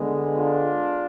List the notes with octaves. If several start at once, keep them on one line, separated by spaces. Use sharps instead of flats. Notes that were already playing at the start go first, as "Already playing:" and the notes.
Already playing: D3 G#3 B3
D4 F4